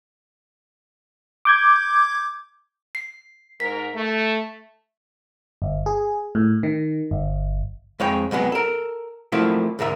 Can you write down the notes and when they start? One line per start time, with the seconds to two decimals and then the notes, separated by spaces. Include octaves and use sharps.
1.45 D6 G6 G#6
2.95 C7
3.60 G#2 A#4 B6
3.94 A3
5.62 G1
5.86 G#4
6.35 A2
6.63 D#3
7.11 G1
8.00 F2 G#3 C#5 G5
8.31 C2 F#3 G#3 B3
8.52 A4 A#4
9.32 F3 F#3 A3 A#3 E4
9.79 D2 G#2 A#4 E5